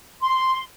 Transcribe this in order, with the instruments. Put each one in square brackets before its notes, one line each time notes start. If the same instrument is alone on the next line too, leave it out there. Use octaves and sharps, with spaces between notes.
[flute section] C6